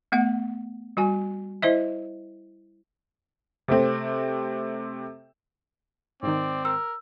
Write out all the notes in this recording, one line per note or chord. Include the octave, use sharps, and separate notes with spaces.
A3 B3 F#5
G3 F#4 G#5
E4 C5 D#5 E5
C3 A3 C4
G#2 D#3 C4 D5
A#4 E6